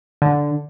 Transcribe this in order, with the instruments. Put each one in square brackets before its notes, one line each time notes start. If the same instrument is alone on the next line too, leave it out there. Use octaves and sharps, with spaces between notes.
[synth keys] D3